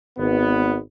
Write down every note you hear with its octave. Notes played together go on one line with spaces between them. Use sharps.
G#1 B3